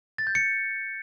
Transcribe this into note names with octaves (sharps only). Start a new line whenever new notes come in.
A6
G6
C#7